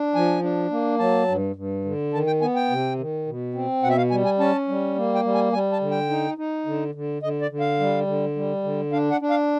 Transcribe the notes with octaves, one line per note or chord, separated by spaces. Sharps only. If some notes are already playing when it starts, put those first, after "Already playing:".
Already playing: D4
F3 G#5
D4
A#3
F#3 A5
G2
G2
D3
D#3 A5
G5
B3 G#5
G5
C3
D#3
B2
C4
B2 F#5
E5
F5
G3 G#5
G#5
C#4 A5
G3
A#3
G5
G3
G#5
G3 G#5
A5
D3
G5
D#4
D#4
D3
D3
D3 D#5
D5
D3
F5
G3
D3
G3
D3
D4 F5
F#5
D4
F5